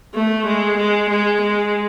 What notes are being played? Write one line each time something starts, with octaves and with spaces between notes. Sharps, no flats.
A3
G#3
G#3
G#3
G#3